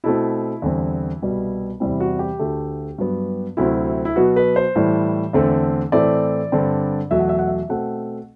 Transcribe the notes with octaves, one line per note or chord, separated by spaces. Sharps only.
B2 A3 C4 E4
E2 D3 G3 C4
C2 B2 G3 B3
E2 C3 G3 C4 E4
F#4
G4
D2 D3 A3
G2 F#3 B3
D2 C3 F#3 C4 E4
E4
B2 F#3 B3 F#4
B4
C5
A2 E3 G3
E2 D3 A3 C4
A2 E3 A3 C4 D5
G2 D3 G3 C4
E2 B2 F#3 A3 E5
F#5
E5
F#5
E5
B2 A3 C4 F#5